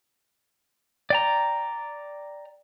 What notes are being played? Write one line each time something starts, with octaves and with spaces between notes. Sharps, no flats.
D5 G5 A#5